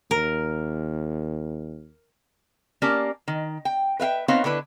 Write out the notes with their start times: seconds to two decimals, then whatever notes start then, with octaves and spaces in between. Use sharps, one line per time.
0.11 D#2 A#4
2.82 A#3 C#4 G4 A#4 D5 A5
3.28 D#3
3.65 G5
4.00 B4 E5 F5 G5
4.28 B3 C4 D#4 B4 C#5 F5
4.44 D3 D4 E4 B4